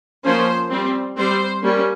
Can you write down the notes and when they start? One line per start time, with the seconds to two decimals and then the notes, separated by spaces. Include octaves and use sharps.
0.23 F3 A#3 C#4 C5
0.70 G3 C4
1.16 G3 C4 C5
1.62 G3 A#3 C#4